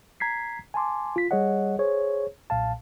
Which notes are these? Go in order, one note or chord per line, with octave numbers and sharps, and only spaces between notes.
A#5 G#6 B6 C7
G#5 A5 C6 D6
F4 B6
G3 G#4 C#5 D#5 F#5
G#4 C5 C#5
B1 A#2 F5 A5